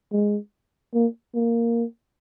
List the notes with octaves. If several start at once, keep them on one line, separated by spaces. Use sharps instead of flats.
G#3
A#3
A#3